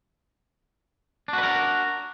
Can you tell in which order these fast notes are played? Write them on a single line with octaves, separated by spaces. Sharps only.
D4 F#4 B4 A#4